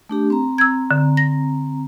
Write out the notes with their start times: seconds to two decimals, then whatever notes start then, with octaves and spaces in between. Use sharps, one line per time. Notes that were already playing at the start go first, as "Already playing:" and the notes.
0.09 A3 D4 G4
0.30 C4 A#5
0.58 E6 G#6
0.91 D3
1.17 A#6